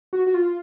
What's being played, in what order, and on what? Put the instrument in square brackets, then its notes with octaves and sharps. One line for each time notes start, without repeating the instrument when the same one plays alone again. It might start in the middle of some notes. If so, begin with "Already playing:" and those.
[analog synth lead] F#4
F#4
F4